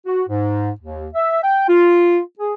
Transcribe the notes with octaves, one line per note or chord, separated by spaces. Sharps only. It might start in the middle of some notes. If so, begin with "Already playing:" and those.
F#4
G#2
D#2
E5
G5
F4
G#4